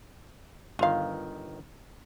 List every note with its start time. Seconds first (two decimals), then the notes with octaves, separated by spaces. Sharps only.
0.79 G1 D#3 F4 F5